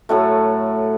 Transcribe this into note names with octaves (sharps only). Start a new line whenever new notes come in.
A2 F#3 A3